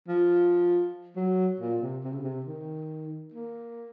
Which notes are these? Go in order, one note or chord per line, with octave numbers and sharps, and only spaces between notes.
F3
F#3
A#2
C3
C3
C#3
C3
D#3
A#3